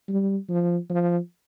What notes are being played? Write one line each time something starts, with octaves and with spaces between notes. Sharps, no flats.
G3
F3
F3